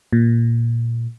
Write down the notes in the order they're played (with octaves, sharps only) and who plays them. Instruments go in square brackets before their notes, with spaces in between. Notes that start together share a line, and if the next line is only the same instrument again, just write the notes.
[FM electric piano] A#2